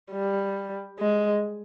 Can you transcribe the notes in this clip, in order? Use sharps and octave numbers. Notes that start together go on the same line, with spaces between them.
G3
G#3